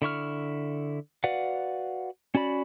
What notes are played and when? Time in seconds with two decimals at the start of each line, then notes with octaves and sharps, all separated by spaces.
0.02 D3 E4 C#6 F6
1.24 F#4 B4 D5 F5 F#5
2.35 C#4 F#4 D5 B5